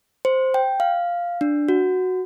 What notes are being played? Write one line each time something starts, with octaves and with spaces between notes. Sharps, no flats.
C5
G5
F5
D4
F#4